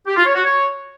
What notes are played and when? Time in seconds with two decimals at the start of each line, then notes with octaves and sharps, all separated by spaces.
0.07 G4
0.16 F4
0.26 C#5
0.35 F#4
0.44 C#5